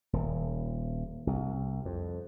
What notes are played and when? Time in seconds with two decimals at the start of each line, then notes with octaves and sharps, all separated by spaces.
0.13 D#1
1.27 C2
1.85 F2